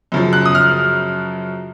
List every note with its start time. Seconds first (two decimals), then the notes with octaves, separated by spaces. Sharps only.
0.12 F#2 C#3 F3
0.33 F#6
0.45 D#6
0.55 F6